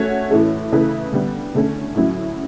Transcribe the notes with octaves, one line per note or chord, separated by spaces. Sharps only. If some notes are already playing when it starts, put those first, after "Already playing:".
Already playing: A3 C#4 F#4 C#5
A2 E3 A3
C#3 E3 A3 E4 B4
D3 G3 B3
D3 A3 C#4
A2 F#3 C#4 E4